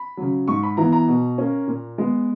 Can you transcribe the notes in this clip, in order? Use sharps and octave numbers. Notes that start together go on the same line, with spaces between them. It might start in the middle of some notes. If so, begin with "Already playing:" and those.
Already playing: B5
C#3 F#3
G#2 C#6
B5
E3 B3 A#5
A#5
B2
A#3 C#4
A#2
G#3 B3